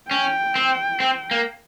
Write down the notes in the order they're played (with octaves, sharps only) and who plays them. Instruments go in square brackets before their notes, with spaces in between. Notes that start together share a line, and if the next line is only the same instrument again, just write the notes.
[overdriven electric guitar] C#4 [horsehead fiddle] G5
[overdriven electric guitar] C4
C4
A#3